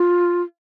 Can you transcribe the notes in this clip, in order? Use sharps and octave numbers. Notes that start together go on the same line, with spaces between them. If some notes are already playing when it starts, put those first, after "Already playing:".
Already playing: F4